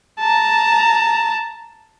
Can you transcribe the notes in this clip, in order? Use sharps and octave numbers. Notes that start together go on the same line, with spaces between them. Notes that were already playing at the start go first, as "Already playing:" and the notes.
A5 A#5